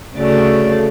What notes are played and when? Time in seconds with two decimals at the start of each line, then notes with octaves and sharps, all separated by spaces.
0.16 D2 C#3 F#3 A3 D5